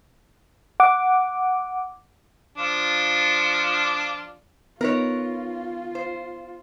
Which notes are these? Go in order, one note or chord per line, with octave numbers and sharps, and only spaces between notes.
F#5 D6
F3 D4 F4
B3 D#4 F4 A#4 B4 C#5
C5